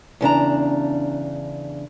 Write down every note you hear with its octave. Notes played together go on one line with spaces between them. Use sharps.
E2 C#3 D4 A#5